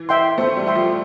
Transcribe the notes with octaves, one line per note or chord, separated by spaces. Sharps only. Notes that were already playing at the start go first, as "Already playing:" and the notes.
Already playing: E3
E5 G5 C6
A3 C5
G3
E5 G5 C6
F3